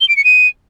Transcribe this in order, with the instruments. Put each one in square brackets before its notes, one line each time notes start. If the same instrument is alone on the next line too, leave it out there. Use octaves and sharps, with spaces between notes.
[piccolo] G7
D7
C#7
D#7